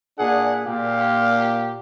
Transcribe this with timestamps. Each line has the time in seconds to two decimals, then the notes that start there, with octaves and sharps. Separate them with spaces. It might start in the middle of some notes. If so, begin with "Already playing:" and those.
0.19 A#2 D4 G#4 F#5
0.66 A#2 G4 F5